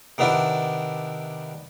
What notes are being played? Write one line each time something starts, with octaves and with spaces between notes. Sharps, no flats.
C3 D#3 B3 D4 E4